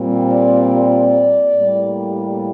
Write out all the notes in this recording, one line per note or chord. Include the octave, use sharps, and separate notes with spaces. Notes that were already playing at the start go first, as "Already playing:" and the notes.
Already playing: A#2 G3 C4
D5
D5
A2 G3 A#3